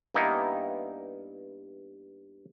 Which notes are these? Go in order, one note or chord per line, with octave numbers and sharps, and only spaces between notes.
G2 A#3 B3 D#4 E4